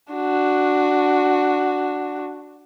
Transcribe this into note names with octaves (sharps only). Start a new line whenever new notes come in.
D4 F#4